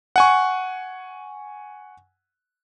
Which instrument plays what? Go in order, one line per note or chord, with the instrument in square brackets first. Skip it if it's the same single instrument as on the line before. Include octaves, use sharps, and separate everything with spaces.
[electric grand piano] F#5 G#5 C#6